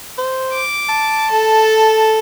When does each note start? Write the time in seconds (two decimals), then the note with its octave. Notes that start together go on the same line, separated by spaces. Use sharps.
0.18 C5
0.52 D6
0.89 A5
1.31 A4